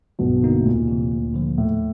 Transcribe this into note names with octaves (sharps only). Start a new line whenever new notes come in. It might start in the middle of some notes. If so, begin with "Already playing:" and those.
B1 G2 B2
D3 F#3 A#3 D#4
A2
D2 A#2
C3 E3
D2
D3 F3
D#2 A2